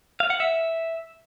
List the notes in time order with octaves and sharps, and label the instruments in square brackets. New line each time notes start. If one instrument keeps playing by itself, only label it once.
[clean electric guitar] F5
F#5
E5